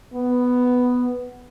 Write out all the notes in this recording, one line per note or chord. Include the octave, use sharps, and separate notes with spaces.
B3